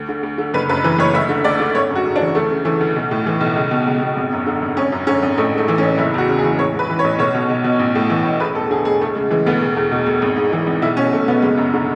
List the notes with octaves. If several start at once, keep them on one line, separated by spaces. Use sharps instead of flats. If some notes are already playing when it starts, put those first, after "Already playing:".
Already playing: D2
D3
D2
D3
F#1 B4
F#2 B4
E3 B4
F#1 C#5
D2 E5
D3
D2 D5
D3
G#1 C#5
F#2
F#4
C#3
D4
E3
D2 A3
C#3
E3 A3
D2
B1
A2
E3
B1
C#2
B2
C#2
B2
G#1
F#2
D3
G#1
G#1 C#4
F#2
D3 C#4
G#1
A1 A3
G#2 A3
E3
C#4
A1
F#1 E4
E2 F#4
C#3
G#4
E3
A1 C#5
G#2
B4
E3
C#5
A1
B1 C#5
B2
B1
B2
A1
A2
E3
A1
E1 B4
E2 A4
D3 G#4
E1 G#4
D2 A3
C#3 G#3
E3 G#3
D2 B3
E1
E2
B2
E1
G#1
G#2
E3
G#1
B1 E4
B2 C#4
B1 A3
B2 B3
F#1 G#3
F#2
D3